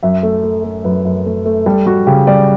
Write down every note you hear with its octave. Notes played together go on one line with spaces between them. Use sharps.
F#2 E5
A3
A3
A3
F#2 B4
F#2
A3
A3
G3 A4
G3 F#4
C#3 G4
G3 D5